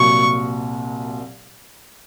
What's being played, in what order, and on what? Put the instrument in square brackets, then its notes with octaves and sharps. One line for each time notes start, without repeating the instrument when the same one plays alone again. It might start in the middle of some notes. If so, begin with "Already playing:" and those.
Already playing: [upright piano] C2 A#2 F#3 [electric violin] C#6